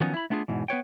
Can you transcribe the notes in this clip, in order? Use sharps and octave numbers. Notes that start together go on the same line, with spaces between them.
D#3 F3 F#3 B3 C#4 D#4
E4 B5
A3 B3 D4 F4 G#4
E2 G#2 B2 E3
B3 B4 C#5 G5